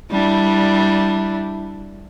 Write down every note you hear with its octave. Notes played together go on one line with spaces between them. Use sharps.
G3 D4 E4